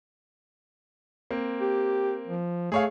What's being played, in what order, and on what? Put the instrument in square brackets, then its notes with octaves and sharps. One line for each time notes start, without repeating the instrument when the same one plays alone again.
[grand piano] A#3 C4
[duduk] G4
F3
[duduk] A3 [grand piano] G#4 C#5 F5